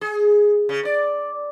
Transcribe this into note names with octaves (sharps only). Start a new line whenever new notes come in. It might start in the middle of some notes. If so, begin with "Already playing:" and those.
G#4
C#3
D5